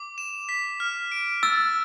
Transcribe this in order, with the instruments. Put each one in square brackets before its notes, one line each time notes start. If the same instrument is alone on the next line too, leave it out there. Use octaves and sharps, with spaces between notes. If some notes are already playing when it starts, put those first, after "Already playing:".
Already playing: [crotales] D6
E7
B6
F6
D7
[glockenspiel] E6 [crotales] A6